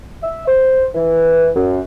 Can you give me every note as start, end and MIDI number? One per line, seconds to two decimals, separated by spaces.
0.23 0.45 76
0.47 0.86 72
0.95 1.49 52
1.56 1.82 42